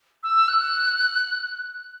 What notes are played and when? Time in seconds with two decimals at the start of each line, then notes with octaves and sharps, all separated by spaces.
0.23 E6
0.48 F#6